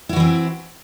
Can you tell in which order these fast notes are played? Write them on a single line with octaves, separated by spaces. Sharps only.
E4 F#4 E3 C4